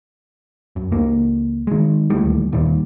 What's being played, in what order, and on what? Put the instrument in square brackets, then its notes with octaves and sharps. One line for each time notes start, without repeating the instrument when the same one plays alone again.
[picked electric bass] F#2
C#2 A#3
D#3 G#3
D1 D#2 A2 G3
D#2 A#2 D#3 G3